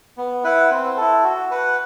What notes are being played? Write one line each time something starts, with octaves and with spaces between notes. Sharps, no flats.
B3
E4 B4 F#5
C4
E4 A4
F#4
B4 F#5